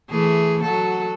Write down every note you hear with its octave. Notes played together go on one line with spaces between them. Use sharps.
E3 A3 G#4
F#3 F#4 A4